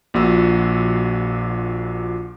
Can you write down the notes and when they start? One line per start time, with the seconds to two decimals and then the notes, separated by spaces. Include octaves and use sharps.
0.14 A#1 A#2 F#4 E6